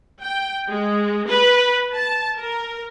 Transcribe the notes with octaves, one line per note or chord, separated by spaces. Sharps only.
G5
G#3
B4
A5
A#4